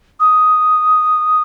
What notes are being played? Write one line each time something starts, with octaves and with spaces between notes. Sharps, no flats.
D#6